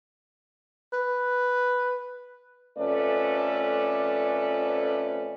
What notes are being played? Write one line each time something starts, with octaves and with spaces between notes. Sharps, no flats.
B4
F2 A3 C#4 A4 B4 D5